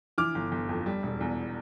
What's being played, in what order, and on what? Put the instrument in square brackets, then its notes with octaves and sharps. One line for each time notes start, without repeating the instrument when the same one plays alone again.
[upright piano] E3 D6 F6
G1
G1
F2
G3
E1
E2